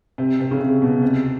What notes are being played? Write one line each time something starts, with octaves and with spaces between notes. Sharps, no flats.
C3
C3
C#3
C3
B2
C3